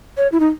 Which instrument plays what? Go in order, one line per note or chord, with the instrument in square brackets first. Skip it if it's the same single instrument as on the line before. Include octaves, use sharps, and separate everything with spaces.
[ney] C#5
E4
D#4